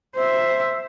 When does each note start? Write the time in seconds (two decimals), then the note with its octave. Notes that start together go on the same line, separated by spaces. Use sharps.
0.15 C5 E5